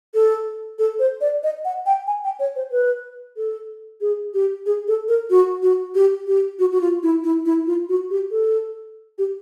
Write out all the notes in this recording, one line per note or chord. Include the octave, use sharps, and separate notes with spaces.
A4
A4
C5
D5
D#5
F#5
G5
G#5
G5
C#5
C5
B4
A4
G#4
G4
G#4
A4
A#4
F#4
F#4
G4
G4
F#4
F#4
F4
E4
E4
E4
F4
F#4
G4
A4
G4